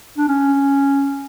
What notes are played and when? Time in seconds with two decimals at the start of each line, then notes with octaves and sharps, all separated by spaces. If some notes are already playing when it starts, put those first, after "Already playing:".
0.18 D4
0.28 C#4